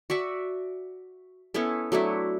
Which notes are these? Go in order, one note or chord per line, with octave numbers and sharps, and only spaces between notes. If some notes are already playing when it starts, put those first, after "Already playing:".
F#4 D5 E5 A5
B3 C#4 E4 A4
F#3 A3 D4 E4